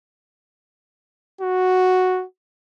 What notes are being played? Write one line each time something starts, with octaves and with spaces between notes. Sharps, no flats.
F#4